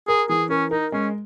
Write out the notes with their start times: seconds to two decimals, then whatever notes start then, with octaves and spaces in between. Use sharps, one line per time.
0.08 G#4 A#4
0.29 E3 G#4
0.50 C#4 A#4
0.71 D#4 A#4
0.92 G#3 C#4